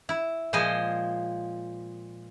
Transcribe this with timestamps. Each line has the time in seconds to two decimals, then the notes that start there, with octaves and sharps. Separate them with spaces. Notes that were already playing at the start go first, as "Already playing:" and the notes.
0.09 E4
0.53 A#2 F3 G#3 C5 D#5 G#5